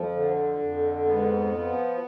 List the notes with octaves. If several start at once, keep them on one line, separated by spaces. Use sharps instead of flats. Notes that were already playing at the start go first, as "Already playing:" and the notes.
Already playing: F2 F3
D3
F2
G#2 B3
F3